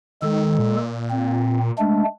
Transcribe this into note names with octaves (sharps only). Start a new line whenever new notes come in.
D#3 G#3 A4
A#2
C4
G#3 A3 D4